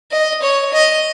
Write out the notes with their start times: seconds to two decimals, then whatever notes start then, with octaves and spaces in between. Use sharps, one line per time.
0.12 D#5
0.42 C#5
0.73 D#5